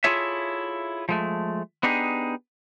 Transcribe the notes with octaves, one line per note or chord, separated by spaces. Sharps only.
E4 F4 G#4 A4 C#5 E5
F3 G#3 A3
B3 D4 D#4 G4 G#4